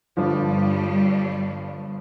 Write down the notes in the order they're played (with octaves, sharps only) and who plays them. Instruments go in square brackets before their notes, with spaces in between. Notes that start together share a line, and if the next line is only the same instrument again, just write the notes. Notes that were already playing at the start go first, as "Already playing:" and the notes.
[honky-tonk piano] G1 G2 F3 [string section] G3